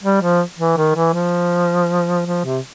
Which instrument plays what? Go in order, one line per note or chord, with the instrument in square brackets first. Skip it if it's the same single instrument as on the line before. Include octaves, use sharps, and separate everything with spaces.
[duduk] G3
F3
E3
D#3
E3
F3
F3
C3